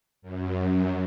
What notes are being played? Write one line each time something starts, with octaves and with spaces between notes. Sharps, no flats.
F#2